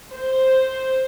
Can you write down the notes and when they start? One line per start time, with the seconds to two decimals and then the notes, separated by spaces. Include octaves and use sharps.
0.12 C5